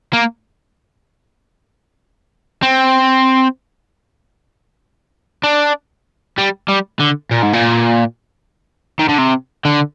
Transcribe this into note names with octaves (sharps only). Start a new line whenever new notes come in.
A#3
C4
D4
G3
G3
D3
A#2
G#2
A#2
D#3
D3
C3
D3